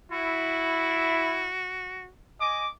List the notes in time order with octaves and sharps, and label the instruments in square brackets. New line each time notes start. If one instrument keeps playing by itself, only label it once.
[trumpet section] E4 [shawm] F#4
[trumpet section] D#5 G#5 D6